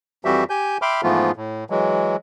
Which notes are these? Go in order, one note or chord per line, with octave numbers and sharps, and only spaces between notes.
F2 E3 G3 F#4 G4 E5
G4 G#5 G6
E5 G5 B5 C6 D6 F6
G#2 E3 F3 A3 B3 F4
A2
E3 F#3 G#3